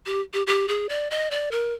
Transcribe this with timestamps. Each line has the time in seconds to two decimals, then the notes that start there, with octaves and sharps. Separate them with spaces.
0.06 G4
0.34 G4
0.47 G4
0.68 G#4
0.89 D5
1.11 D#5
1.31 D5
1.51 A#4